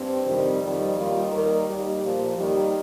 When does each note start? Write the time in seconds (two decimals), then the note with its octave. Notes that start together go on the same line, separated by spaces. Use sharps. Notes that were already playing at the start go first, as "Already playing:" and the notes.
Already playing: G2 C4
0.25 F2 C3 D#3 G3
0.61 F2 D#3 G3
0.95 D#2 D#3 G3 F4
1.30 D#2 D#3 G3 A#4
1.66 D#2 D#3 G3 G4
2.02 A#2 F3
2.37 D#2 D#3 G3 G4